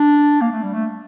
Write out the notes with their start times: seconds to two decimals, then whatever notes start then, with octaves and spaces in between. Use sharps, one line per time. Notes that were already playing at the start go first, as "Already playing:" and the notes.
Already playing: D4
0.41 A#3
0.52 A3
0.63 G3
0.74 A3